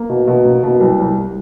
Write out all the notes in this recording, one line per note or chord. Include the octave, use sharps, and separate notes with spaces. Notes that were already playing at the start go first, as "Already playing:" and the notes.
Already playing: A#3
B2
B2
A#3
B2
C2
C2